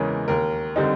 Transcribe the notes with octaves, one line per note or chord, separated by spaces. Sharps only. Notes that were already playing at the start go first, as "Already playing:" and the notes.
Already playing: E2 C#3 E3 G#3 C#4 A#4
D#2 A#4
D3 G3 C4 D#4